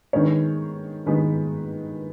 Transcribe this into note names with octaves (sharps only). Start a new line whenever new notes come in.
D#3 G#3 B3 C#5
D#3 G#3 B3 B4